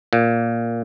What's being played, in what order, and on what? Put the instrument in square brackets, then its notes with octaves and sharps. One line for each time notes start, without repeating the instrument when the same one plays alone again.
[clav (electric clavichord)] A#2